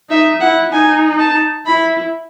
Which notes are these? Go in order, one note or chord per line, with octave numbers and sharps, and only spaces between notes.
D#4 E5
E4 F#5
D#4 G#5
A5
E4 B5